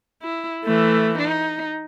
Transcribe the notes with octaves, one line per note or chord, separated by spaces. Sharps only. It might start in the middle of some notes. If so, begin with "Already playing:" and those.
E4
E3 A3
D#4